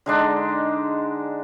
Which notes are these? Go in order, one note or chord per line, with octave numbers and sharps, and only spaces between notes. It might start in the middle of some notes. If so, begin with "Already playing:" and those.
D3 G#3 D4 D#4